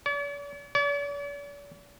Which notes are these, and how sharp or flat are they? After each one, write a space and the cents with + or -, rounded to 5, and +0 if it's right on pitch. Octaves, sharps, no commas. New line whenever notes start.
D5 -45
D5 -45